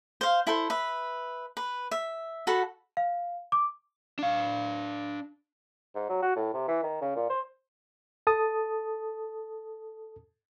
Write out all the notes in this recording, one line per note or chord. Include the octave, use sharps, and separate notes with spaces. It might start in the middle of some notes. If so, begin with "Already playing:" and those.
C5 F5
E4 A4 C5
B4 E5
B4
E5
F#4 A4 F#5 B5
F5
D6
D4 F5
G#2
F#3
F#4
A2
C3
E3
D#3
C#3
A#2
C5
A4 A5 D#6